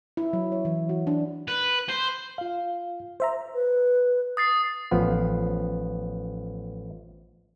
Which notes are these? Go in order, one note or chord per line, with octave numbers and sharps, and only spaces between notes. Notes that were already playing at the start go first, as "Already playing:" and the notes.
E4
F#3
C#5
E3
F#4
D4
B4
C5
F4 F5
C5 E5 A#5
B4
D#6 A6 C7
A1 F3 B3